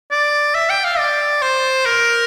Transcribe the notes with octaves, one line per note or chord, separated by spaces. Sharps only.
D5
E5
G5
F5
D5
C5
A#4